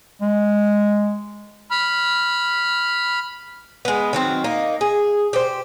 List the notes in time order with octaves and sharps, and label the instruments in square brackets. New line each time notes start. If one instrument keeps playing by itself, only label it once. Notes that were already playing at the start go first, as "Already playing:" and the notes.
[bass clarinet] G#3
[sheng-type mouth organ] B5 F6
[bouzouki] G#3 B3
D#3 F#3 C4
A#3 D#4
G#4
G4 C5